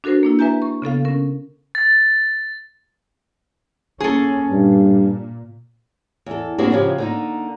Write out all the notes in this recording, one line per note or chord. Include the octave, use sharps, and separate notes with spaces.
D4 F#4 A4 A#4 C5
A#3 D4 E4
B4 E5 G#5 A#5 G6
C#6
C#3 B3 A4 F5
C#4 A#4
A6
A#3 C#4 G#4 A4
G2 A#2
E2 A4
A#3 C4 D4 E4 F#4 G#4
C#3 F3 F#3 G4 G#4
D3 A#3 D#4